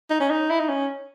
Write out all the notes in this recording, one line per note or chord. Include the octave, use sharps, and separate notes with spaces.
D#4
C#4
D#4
E4
D#4
C#4